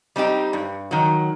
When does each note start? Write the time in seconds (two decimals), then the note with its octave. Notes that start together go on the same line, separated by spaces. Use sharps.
0.16 G3 C4 D#4 G4
0.53 G2
0.91 D#3 F#3